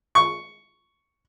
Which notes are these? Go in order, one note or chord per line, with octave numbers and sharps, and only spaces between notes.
C#6